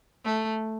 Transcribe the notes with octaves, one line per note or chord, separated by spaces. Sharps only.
A3